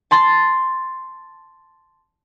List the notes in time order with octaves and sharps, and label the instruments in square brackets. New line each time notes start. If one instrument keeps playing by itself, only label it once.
[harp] A5 C6 A6